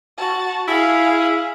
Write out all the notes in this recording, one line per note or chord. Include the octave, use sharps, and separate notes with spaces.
F#4 A5
E4 G#4 F5